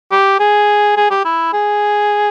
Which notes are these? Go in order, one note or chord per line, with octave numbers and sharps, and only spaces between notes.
G4
G#4
G#4
G4
E4
G#4